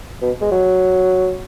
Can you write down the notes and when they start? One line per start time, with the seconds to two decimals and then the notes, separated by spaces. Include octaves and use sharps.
0.22 B2
0.41 G#3
0.52 F#3